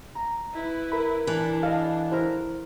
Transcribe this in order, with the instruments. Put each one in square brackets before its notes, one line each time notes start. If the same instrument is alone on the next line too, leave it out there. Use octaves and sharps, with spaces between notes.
[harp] A#5
[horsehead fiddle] E4 B4
[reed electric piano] A#4 B5
[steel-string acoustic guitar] E3 [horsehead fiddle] D4
[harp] A4 D#5 [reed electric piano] F5
[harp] E4 A#4 [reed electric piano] C5